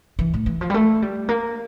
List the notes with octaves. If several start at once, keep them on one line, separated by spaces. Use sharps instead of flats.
E3
A2
E3
F3
G3
A3
G3
A#3